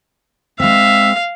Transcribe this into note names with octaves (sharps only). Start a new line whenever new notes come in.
G#3 C4 E5 F5